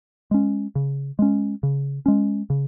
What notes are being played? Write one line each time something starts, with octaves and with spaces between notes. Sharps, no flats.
G#3 C#4
C#3
G#3 C#4
C#3
G#3 C#4
C#3